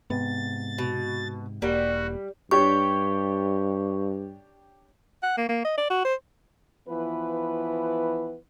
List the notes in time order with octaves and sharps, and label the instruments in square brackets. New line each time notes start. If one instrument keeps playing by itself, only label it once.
[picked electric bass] G#2 C3 [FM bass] B3 [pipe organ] A6
[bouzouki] B2
[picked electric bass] E1 [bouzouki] G3 [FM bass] A#3 [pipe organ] F#4
[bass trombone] G2 [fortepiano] D4 G4 C#5 [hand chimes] C#6
[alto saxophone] F#5
A#3
A#3
D#5
D5
F#4
C5
[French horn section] E3 F3 B3 B4